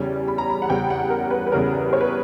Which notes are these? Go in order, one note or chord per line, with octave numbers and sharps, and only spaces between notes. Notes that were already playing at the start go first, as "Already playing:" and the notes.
Already playing: E2 C#3 G3 C#4
B5
A#5
B5
F#5
E2 C#3 G3 C#4 G5
F#5
A#4
B4
B4
E2 C#3 G3 C#4 A#4
C#5
B4